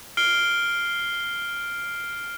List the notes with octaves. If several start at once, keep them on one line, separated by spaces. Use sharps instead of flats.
F6 C7 D7 G7